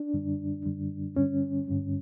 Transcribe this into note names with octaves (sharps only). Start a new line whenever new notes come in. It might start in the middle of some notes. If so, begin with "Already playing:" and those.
Already playing: D4
F#2 D3 G3
F#2 D3 G3
G2 D3 G3 C#4
G2 D3 G3